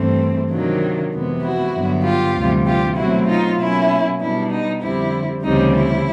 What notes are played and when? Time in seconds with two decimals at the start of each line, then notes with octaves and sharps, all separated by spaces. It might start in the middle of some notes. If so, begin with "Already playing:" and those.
Already playing: G2 E3 A3 C4
0.50 C3 D#3 F#3 A#3 D4
1.11 F2 C3 E3 G#3 B3
1.42 E4 F#4
1.73 G2 D3 F#3 B3
2.04 F4 G4
2.35 D2 C3 E3 G3
2.66 F4 G4
2.96 B2 F#3 A3 C4 E4 F#4
3.27 D#4 F4
3.58 B2 F#3 A#3 C#4 E4
4.20 B2 G3 B3 D4 E4
4.51 D#4
4.81 F2 D3 G3 C4 E4
5.43 D2 C#3 E3 G3 C4 D#4
5.74 E4